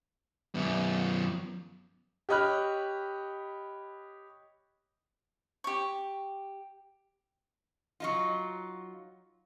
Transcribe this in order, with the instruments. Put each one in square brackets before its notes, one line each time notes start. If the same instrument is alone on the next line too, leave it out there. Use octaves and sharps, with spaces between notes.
[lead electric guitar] F#2 B3
[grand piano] G4 C#5 D#5 B5 F6 F#6
[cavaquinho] G4 C#6
[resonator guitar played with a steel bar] F#3 D#4 F4